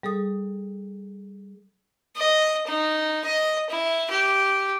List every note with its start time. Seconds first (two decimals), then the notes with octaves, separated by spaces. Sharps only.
0.03 G3 G#4 A4 D#6
2.16 D#5
2.67 D#4
3.24 D#5
3.70 E4
4.11 G4